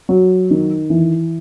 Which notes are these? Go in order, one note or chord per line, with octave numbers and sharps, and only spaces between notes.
F#3
D#3
E3